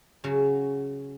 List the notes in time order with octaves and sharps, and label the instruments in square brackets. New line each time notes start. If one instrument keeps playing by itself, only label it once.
[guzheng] C#3 F#3 F#4